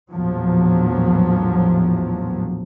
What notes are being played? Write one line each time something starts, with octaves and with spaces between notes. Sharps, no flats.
A#1 E2 A2 F3 F#3